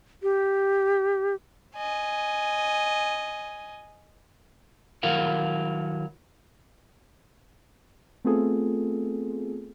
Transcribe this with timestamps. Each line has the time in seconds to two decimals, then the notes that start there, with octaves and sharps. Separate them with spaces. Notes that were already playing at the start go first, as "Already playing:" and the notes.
0.23 G4
1.76 D#5 G#5
5.03 D#3 F#3 E4 A#4 F5 F#5
8.25 A3 B3 C4 F4 G#4 A4